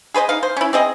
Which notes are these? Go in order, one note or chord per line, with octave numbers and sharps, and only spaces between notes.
G#4 B4 C5 D#5
D#4 F5
C5
C#4 E4
C4 G#4 D#5